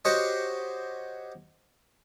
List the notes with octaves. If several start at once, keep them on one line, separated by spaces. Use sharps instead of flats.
F#4 G4 C5 C#5 D#5